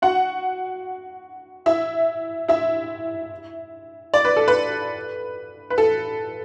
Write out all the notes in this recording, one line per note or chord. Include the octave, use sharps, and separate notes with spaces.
F#4 F#5
E4 E5
E4 E5
D5
B4
A4
B4
B4
A4